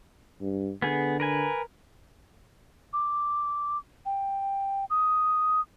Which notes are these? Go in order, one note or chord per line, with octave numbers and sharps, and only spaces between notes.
G2
D3 B3 G#4
A#4 B4 G#5
D6
G5
D#6